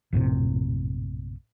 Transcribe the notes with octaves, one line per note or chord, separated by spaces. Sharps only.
A#1 F#2 A2 C3